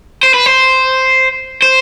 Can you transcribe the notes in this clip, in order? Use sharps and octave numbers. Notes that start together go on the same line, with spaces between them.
C5
B4
C5
C5